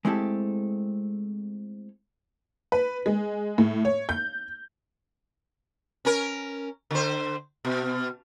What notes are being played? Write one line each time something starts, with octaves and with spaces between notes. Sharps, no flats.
G#3 A3 C4 E4 G4 A4
B4
G#3
A2
C#5
G6
C#4 A#4
D3 C5
B2